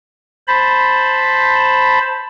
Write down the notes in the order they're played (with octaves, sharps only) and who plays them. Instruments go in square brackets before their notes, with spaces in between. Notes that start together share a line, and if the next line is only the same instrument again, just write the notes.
[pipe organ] C5 A5 B5